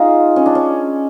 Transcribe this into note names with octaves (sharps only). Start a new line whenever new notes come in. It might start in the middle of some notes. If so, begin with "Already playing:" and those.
Already playing: D#4 F4 G#4
C#4
D4
C#4